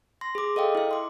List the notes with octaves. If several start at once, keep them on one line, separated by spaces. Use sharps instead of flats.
C6 A#6
G#4 D6
A4 D#5 F5 G5
E4 E5
C6 D6